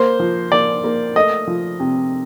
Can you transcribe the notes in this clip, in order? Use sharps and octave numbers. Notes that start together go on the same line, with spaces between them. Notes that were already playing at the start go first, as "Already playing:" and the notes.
Already playing: A#3 C5
F3
A#3 D5
A#3
A3 D#5
F3
C3